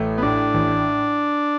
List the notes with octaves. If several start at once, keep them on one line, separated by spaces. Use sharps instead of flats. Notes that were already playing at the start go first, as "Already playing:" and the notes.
Already playing: A1 A3
B3
A2 D4
A1